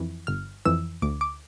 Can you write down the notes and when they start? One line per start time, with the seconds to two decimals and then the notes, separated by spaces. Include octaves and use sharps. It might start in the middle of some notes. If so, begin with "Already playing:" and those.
Already playing: F2 E3
0.27 G1 F6
0.65 F2 E3 E6
1.02 D2 D6
1.21 D6